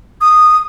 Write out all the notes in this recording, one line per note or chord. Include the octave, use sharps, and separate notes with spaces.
D#6